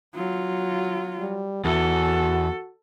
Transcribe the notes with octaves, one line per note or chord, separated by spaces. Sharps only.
F#3 F4
G3
E2 F#4 A4